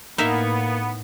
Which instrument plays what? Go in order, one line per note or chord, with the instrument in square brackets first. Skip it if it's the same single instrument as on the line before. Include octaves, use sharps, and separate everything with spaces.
[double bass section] A2 [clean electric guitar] A#3 [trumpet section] B3 [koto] D#4 A#4 E5